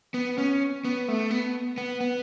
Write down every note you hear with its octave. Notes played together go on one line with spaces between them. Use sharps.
B3
C#4
B3
A3
B3
B3
B3